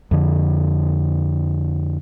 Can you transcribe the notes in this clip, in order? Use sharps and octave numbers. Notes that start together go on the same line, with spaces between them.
F2 D3